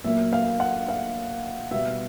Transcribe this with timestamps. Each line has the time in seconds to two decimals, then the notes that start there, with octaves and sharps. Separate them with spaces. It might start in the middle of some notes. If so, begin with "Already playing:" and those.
0.04 A#2 F#3 A#3 E5
0.33 F5
0.60 F#5
0.89 F5
1.71 B2 G3 B3 E5